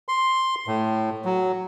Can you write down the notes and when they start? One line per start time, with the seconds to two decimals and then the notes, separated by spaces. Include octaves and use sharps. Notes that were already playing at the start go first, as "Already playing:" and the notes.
0.08 C6
0.67 A2
1.25 F#3